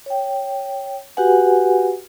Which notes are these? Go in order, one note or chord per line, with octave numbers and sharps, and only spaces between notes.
C#5 G5
F#4 G4 B4 F#5 G#5